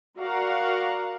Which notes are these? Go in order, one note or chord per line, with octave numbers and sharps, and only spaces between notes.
F#4 A#4 D5 F5 F#5 A#5